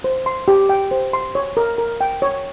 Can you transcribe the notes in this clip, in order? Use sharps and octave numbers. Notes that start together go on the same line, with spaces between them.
C5
C6
G4
G5
C5
C6
C#5
A#4
A#4
G5
C#5